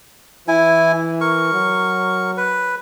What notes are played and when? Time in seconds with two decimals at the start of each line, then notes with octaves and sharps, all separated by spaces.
0.48 E3 E4 G#5
1.21 A#4 C#6
1.53 F#3
2.37 B4